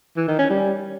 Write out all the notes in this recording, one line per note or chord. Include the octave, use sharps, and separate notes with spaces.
E3
D#3
C#4
G3